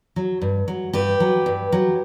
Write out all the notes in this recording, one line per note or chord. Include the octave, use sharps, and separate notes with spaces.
F#3
G2
F#3
G2 G4 B4
F#3
G2
F#3